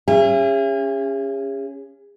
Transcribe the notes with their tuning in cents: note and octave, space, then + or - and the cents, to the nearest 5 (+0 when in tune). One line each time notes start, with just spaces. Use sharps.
C#4 +0 G#4 -40 E5 +35